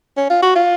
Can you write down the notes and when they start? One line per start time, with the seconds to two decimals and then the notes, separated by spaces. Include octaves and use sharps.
0.17 C#4
0.30 F4
0.43 F#4
0.56 F4